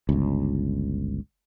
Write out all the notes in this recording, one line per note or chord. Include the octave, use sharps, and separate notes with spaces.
G1 C#2